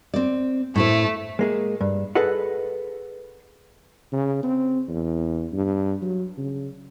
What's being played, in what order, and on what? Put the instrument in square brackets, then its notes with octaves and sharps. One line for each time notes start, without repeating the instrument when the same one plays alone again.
[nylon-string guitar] C4 D5
[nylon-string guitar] A2 E4 C5 [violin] A3
[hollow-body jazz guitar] G#3 A#3 G#4
G2
G#4 A4 B4 D#5 F#5
[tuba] C#3
C4
E2
G2
F#3
C#3